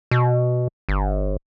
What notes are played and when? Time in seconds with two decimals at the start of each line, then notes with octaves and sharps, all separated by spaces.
0.11 B2
0.89 G1